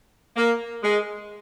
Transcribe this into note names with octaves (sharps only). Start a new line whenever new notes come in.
A#3
G#3